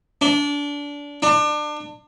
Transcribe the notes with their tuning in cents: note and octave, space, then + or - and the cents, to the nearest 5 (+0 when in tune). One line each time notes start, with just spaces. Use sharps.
D4 -25
D4 +30